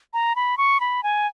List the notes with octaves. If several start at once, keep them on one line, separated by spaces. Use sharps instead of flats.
A#5
B5
C#6
B5
G#5